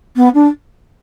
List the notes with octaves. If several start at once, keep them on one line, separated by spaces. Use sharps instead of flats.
B3
D4